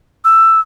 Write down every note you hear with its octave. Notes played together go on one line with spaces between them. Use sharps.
E6